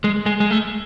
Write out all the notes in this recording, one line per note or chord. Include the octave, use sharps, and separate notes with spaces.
G#3
G#3
G#3
A3